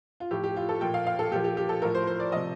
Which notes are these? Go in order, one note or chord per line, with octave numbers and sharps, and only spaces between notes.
F4
A2 F3 G4
G4
F4
A4
A#2 F3 G5
F5
F5
A4
A#2 F3 G4
G4
G4
A4
A2 F3 A#4
C5
C5
D5
C3 F3 D#5